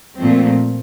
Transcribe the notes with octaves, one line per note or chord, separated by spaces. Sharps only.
A#2 F3 A3 C4